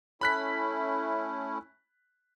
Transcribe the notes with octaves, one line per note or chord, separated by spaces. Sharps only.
A3 C#4 E4 B5 F#6 B6